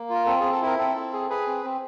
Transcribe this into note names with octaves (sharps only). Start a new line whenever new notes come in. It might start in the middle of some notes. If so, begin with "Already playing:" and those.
Already playing: A#3
F4 A#4
C4 A4
C4 G#4
A4
E4 A#4
C4 A4
C4
G#4
G#4 B4
C4
C4